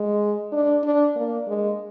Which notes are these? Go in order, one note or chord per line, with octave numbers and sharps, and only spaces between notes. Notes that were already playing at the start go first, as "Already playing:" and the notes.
Already playing: G#3
D4
D4
A#3
G#3